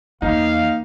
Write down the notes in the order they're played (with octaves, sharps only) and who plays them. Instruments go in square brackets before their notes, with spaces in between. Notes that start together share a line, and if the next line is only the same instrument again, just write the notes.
[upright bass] E2 [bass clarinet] A#3 [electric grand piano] D#4 [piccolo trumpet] F5